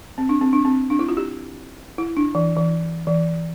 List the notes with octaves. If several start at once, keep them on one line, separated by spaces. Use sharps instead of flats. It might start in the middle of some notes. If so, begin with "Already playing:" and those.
C4
D4
C4
D4
C4
D4
E4
F4
G4
E4
D4
E3
E3
E3